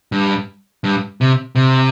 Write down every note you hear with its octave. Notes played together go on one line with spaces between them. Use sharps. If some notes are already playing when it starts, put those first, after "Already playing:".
G2
G2
C3
C3